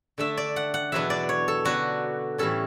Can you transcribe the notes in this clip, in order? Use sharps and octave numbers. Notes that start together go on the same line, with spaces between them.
D3 A3 D4 E5
D5
F#5
F#5
E2 B2 F#3 B3 D4 E5
D5
C#5
A4
D3 F#3 B3 D4 F#4
A2 E3 G3 C#4 A4